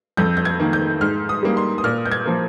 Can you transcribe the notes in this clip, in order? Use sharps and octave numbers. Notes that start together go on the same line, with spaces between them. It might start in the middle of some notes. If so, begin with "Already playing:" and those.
F2 G6
G6
G#6
D#3 A#3
G6
G#2 F6
D#6
G3 A#3
C6
D#6
A#2 F6
G6
G#6
F3 A#3